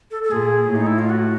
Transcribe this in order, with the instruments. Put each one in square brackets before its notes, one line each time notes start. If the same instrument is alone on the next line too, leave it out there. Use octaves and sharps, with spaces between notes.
[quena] A4
A4
[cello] A#2 [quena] G#4
[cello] A2
[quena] D#4
E4
F4
F#4